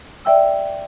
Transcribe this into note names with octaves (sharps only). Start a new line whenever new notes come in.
D5 E5 G5 E6